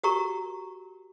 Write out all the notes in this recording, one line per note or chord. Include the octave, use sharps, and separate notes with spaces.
F#4 G4 A#4 A#5 C#6